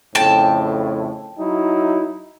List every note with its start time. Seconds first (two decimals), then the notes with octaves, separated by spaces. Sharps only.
0.15 F2 A2 C#3 G5 A5
1.38 F#3 D#4 E4